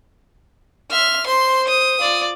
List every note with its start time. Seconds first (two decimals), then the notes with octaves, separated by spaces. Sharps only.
0.91 E5 C6 F6
1.27 C5 C6
1.69 D#6
2.00 F4 D5